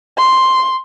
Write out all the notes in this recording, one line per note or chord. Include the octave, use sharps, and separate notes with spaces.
C6